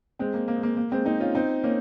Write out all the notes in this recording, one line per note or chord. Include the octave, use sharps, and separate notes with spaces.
G#3 C4
A#3
A#3
G#3
A#3
A#3
G#3 C4
C4 D#4
C#4 F4
C4 D#4
A#3 C#4